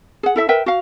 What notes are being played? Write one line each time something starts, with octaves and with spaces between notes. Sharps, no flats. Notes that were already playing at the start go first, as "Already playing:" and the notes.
G#4 F#5
E4 A4 E5
A#4 B4 E5 G5
F#4 F5